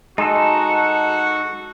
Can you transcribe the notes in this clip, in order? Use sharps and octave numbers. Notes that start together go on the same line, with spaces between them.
G#3 D#4 F#4 A4